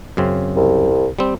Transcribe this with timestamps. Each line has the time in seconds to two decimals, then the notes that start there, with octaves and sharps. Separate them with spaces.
0.17 F#2 C#3 C4
0.56 C2
1.19 G3 C4